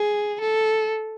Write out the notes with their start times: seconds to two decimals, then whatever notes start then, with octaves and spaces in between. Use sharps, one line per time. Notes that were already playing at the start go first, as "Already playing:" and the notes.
Already playing: G#4
0.41 A4